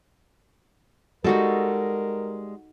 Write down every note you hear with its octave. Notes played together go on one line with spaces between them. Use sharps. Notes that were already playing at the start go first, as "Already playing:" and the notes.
G3 G#3 D#4 F#4 A4 A#4